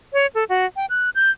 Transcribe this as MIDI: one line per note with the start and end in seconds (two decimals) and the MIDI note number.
0.13 0.26 73
0.35 0.44 69
0.49 0.65 66
0.76 0.86 79
0.89 1.10 90
1.15 1.31 91